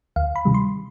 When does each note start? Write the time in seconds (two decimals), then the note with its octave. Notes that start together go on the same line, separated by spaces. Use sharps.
0.16 D2 F5
0.36 B5
0.45 C3 D#3 G3
0.54 C6